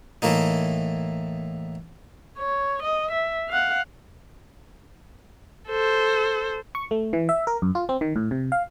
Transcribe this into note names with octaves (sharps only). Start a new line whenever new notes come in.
A2 E3 A3 A#3 D#4
C#5
D#5
E5
F5 F#5
A4 C5
C#6
A3
E3
E5
A#4
F#2
F4
C4
D#3
A2
C3
F5